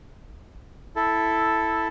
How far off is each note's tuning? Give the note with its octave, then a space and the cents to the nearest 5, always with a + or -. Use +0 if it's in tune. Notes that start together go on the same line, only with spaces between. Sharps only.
E4 +0 A4 +0